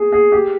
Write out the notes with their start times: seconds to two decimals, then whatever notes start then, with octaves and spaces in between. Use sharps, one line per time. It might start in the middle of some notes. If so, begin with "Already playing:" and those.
Already playing: G#4
0.12 G#4
0.32 G4